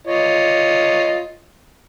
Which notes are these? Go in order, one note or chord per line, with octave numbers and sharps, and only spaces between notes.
F4 C#5 D#5